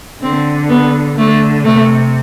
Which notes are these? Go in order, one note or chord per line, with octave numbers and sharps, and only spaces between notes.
D3 C4
B3
D3 A3
C3 A3